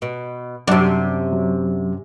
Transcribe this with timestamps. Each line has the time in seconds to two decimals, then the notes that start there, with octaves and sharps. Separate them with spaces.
0.02 B2
0.68 F#2 C3 D4
1.33 F#3